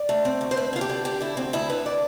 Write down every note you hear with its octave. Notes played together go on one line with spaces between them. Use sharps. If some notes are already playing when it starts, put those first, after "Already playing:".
Already playing: D5
A3
C4
D2
C5
A3 B4
D3 F4
G4
D3
D3 G4
D3 E4
D2 C4
D2 E4
D3 B4
D5